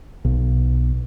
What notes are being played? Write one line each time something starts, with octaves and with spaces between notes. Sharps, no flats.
B1